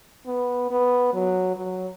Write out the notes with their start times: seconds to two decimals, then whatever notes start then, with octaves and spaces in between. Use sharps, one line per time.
0.26 B3
0.71 B3
1.13 F#3
1.57 F#3